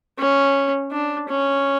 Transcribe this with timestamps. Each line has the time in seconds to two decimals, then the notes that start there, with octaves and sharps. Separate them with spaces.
0.19 C#4
0.92 D4
1.29 C#4